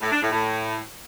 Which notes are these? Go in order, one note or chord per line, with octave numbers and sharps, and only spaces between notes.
A2
D4
A2
A2